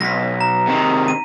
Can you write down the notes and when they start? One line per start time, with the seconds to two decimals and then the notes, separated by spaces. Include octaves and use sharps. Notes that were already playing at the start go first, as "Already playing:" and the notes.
0.01 B1 A#6 B6
0.41 A#5
0.67 C3 D#3
1.08 D#7